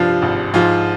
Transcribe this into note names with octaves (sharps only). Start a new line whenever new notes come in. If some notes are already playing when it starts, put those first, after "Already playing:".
Already playing: F1 G2 F3 F4
G#1
G#2 F3 F4